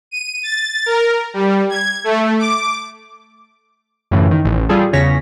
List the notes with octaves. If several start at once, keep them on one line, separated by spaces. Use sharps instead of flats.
D#7
A6
A#4
G3
G#6
A3
D6
F#2 A2 C#3 E3
D#3
A1
G3 F4 G#4 A4
E2 C#3 C#5 A#6 B6